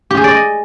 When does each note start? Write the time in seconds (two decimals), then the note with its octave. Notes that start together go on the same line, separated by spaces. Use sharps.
0.11 G4
0.17 G#4
0.24 D5
0.31 D#5